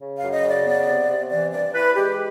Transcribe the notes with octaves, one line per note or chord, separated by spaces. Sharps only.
C#3
F5
F#2
D#5
C#3
D5
B3
C3
C3
E3 D5
G2 D5
E3 B4
G#3 G4